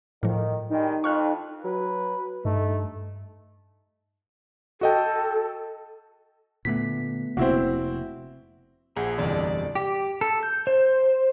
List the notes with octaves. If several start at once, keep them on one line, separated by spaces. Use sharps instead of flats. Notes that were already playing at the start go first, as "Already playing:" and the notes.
A2 D#3 F3
D#3 G3 G#3 D#4
F2 C#6 F6 F#6
F#3 B4
G2 A3 D#4
F#4 A4 D#5 G5
A#2 D3 A3 B3 B6
F1 C3 A#3 C4 E4 F#4
A#1 G#4 C5 F#5 A#5
G1 C2 F2 E3 G3 G#4 D5
G4
A4
G6
C5